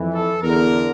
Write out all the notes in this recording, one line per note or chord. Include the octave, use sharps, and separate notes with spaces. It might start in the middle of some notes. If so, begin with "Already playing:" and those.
Already playing: F2 E3
A4
E2 D3 A#4